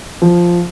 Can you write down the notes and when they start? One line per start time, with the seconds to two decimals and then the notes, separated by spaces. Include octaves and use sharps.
0.22 F3